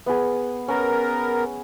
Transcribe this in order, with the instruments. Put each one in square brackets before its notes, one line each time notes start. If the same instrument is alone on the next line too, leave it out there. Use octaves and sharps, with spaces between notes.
[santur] B3 G#4
[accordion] B3 A#4 [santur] C#4